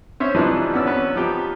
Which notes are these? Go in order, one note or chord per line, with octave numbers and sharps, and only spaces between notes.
C#4 C5 C#5 E5 C6
E3 F3 G3 D4 D#4 B4
E2 B3 C#4 D5 E6
B3 C#4 B4
F3 D#4 G4